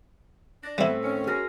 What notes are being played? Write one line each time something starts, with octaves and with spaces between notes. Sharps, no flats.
D4 A#6
A2 E3 G3 A3 B3 C4 E4
F2 D#3 C#4
F#4 G#4 A#4 F6 A#6